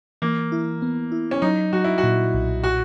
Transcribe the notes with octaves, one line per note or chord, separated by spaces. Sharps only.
E3 A#3
E4
B3
E4
C#4
F#3 D#4
F#3 F#4
E4
F#4
A#2
B1
F#4